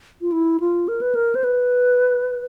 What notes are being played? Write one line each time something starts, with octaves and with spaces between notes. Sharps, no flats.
F4
E4
F4
A#4
B4
A#4
C5
B4